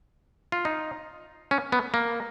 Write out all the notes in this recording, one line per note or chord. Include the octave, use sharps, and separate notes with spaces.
F4
D#4
C#4
B3
A#3